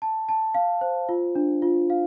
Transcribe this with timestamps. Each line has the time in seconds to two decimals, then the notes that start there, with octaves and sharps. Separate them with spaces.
0.02 A5
0.29 A5
0.55 F5
0.81 C5
1.09 F4
1.35 D4
1.62 F4
1.90 F5